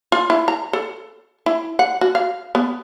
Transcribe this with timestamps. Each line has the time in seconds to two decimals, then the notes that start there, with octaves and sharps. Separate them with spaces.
0.12 F4
0.30 E4
0.48 A#5
0.73 A4
1.46 E4
1.79 F#5
2.01 F#4
2.15 F5
2.55 B3